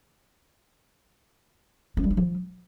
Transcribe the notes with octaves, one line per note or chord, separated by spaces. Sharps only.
C#4
G3
D4
F3